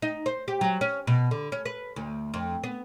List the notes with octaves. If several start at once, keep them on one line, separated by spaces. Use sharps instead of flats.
D#4
C5
G4
F#3
C#4
B2
D3
C#4
B4
D2
F2
B3